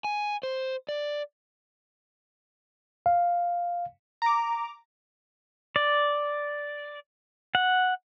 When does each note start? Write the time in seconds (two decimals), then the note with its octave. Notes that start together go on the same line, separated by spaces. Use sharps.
0.04 G#5
0.43 C5
0.89 D5
3.06 F5
4.22 A#5 D6
5.76 D5
7.55 F#5